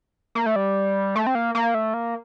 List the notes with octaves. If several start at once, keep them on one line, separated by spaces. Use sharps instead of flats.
A#3
A3
G3
A3
C4
A#3
A#3
A3
A#3